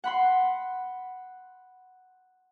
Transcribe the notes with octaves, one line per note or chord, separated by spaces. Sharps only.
F#5 B5 C6